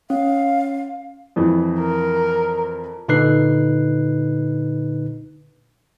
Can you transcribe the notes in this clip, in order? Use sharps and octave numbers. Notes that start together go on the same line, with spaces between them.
C#4 F5
F2 E3
A#4
A#2 D3 D#4 B4 F#6 C7